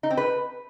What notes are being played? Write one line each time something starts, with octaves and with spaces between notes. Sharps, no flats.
D#4
C4
B4